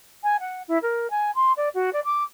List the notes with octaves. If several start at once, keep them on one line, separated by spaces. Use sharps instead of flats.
G#5
F#5
E4
A#4
G#5
C6
D5
F#4
D5
D6